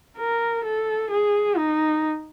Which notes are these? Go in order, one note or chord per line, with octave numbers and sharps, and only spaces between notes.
A#4
A4
G#4
D#4